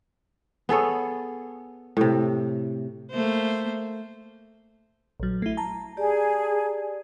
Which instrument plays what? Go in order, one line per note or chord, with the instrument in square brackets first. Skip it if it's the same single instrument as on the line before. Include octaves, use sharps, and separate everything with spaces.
[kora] B3 G#4 A4 C#5
A2 C3
[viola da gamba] A3 A#3 C5
[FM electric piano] A#1 F#3
A3 E4
A5 A#5
[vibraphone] G4 D5 [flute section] G#4